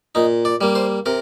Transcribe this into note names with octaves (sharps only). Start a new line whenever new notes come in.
A#2 D#4
D5
G3 A#3
C5
C3 A#4